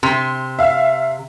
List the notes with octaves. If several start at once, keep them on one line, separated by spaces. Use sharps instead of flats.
C3 C6
E5 F5